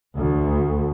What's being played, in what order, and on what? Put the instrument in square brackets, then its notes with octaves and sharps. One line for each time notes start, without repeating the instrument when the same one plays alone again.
[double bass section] D2